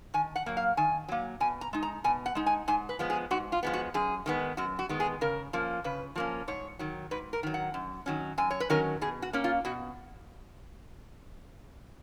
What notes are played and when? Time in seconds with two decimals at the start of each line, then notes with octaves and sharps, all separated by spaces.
0.14 D#3 G#5
0.36 F#5
0.46 F#3 A#3
0.57 F5
0.77 D#3 G#5
1.08 F#3 A#3
1.40 B2 G#5
1.61 A#5
1.73 G#3 D#4
1.83 A#5
2.04 B2 G#5
2.26 F#5
2.35 G#3 D#4
2.46 G#5
2.68 G#2 G#5
2.89 B4
2.99 F3 G#3 B3
3.10 G#4
3.31 G#2 F#4
3.52 F4
3.63 F3 G#3 B3
3.73 F#4
3.94 F#2 G#4
4.26 D#3 G#3 B3
4.57 F#2 F#4
4.79 F#4
4.89 D#3 G#3 B3
5.00 G#4
5.21 C#3 A#4
5.53 F3 A#3 C#4
5.84 C#3 B4
6.16 F3 A#3 C#4
6.48 G#2 C#5
6.79 D#3 F#3
7.11 G#2 B4
7.33 A#4
7.43 D#3 F#3
7.54 F#5
7.74 F#2
8.06 D#3 F#3 C#4
8.38 F#2 G#5
8.50 C#5
8.60 B4
8.70 D#3 F#3 C#4 A#4
9.02 B2 G#4
9.22 F#4
9.33 A#3 C#4
9.44 F4
9.65 B2 F#4